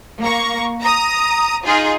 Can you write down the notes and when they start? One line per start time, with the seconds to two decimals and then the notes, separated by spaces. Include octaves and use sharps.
0.21 A#3 A#5 C#6
0.81 A#5 D#6
1.65 D#4 F4 G#4